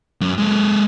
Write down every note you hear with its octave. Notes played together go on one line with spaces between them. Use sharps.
F#2
G#3 A4